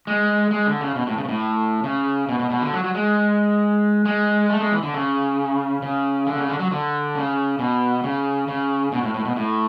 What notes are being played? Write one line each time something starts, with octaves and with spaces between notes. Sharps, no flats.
G#3
G#3
D3
C#3
B2
A2
C#3
B2
A2
C#3
B2
B2
B2
D3
F#3
F#3
G#3
G#3
A3
G#3
E3
D3
C#3
C#3
D3
C#3
D3
F#3
D3
C#3
B2
C#3
C#3
B2
A2
A2
B2
A2